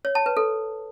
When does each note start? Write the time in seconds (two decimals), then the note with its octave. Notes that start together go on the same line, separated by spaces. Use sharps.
0.05 C#5
0.15 A5
0.26 B4
0.37 A4